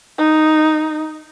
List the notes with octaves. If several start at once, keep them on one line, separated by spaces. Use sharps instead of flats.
D#4